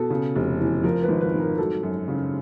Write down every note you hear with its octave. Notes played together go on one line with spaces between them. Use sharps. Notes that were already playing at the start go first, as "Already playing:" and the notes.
Already playing: B2 A4
C#3
F1
E2
F3 A#4
B4
G#1
B4
G#2
A#4
F#3 A4
F#2
C#3